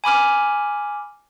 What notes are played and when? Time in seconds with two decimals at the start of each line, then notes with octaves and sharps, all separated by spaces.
0.04 G#5 B5 D6 F6